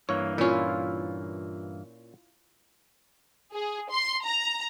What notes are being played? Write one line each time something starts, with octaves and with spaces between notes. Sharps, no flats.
G2 E3 A#3 C#5
A#2 C#4 E4 F4
G#4
C6
A#5